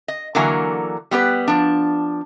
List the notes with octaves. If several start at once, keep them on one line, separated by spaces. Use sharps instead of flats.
D#5
D3 E3 F#3 A#3 G#5
G3 B3 G4 B4
F3 D4